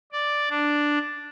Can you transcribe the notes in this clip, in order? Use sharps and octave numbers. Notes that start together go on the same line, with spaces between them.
D5
D4